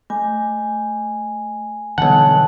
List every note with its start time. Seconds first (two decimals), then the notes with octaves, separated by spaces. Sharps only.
0.10 A3 G#5
1.98 B1 D3 E3 G3 F#5 A5